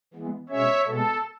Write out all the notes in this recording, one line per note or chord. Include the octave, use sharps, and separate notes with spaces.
E3 G#3 B3
B2 G#3 C#4 C#5 E5
B2 G#3 B3 A4